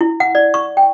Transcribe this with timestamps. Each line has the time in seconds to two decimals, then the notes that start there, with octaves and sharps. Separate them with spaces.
0.01 E4
0.20 F#5
0.35 D5
0.54 C#6
0.77 G5